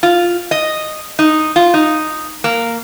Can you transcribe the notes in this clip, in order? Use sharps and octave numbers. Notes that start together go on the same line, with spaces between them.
F4
D#5
D#4
F4
D#4
A#3